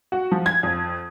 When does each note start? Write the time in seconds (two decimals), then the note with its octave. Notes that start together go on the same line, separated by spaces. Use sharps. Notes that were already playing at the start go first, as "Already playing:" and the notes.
0.12 F#4
0.31 F3
0.46 G#6
0.63 F2